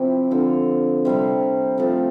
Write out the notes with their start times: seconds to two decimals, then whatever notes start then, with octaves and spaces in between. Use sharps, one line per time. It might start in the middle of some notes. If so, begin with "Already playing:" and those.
Already playing: C3 F3 C4 E4
0.31 D3 F3 C4
1.05 C3 G3 C4
1.78 F3 A3 C4